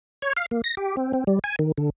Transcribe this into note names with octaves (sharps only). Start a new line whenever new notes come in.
C#5
F5
A#3
A#6
G4
C4
C4
G3
G#5
D#3
D3